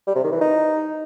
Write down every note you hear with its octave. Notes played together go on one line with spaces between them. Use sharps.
G3
C3
D#3
E3
D#4